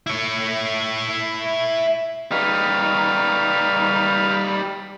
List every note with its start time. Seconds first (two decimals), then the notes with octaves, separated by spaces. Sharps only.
0.07 E4 C#5
2.32 G3 D#4 B4 F5